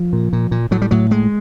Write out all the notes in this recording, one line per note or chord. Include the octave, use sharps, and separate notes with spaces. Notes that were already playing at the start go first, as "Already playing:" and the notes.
Already playing: F3
A#2
A#2
A#2
A2 F#3
G3
A2 F#3
A2 G#3